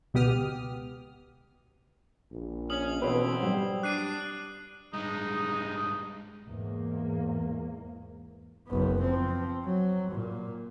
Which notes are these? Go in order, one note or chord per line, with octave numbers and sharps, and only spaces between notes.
C#2 B2 B3 G4 D#6 F6
A#1
C#4 D#6 F#7
B2 D3 E3 C4 C#4 E4 B4
G#2 F#3 G3
D4 F#6 C7 D#7
G2 G#3 D#4
E2 G#2 A#3
F#1 B3
F3 C4
F#3
A#2